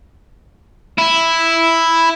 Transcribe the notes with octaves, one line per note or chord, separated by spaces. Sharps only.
E4